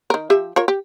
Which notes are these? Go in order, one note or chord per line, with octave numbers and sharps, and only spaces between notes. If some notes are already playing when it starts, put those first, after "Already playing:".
D#3 A#4
F3 G4 E5
F4 A#4 C#5
G4